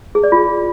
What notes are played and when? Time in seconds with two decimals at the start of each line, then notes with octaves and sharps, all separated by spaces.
0.15 G#4
0.24 D5
0.32 F4